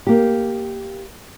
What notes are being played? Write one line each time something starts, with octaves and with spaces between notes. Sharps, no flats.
A#3 G4